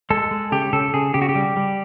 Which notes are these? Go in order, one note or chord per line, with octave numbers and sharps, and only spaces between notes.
G#3 A4
G#3
C#3 G4
C#3 A4
C#3 G#4
C#3 G4
F#4
G4
G3
G3